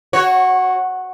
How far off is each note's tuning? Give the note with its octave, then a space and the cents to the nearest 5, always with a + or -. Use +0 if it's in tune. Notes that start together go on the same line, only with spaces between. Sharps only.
F#4 +0 C#5 -20